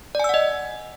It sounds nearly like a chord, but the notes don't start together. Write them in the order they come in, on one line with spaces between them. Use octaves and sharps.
D5 G#5 E6 F#5 D#5